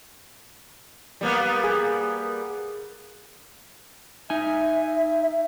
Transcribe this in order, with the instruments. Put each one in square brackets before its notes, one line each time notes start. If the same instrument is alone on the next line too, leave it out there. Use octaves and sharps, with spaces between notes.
[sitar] G3 A#3 B3
[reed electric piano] G#4
[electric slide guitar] D#4 G#5 [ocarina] E5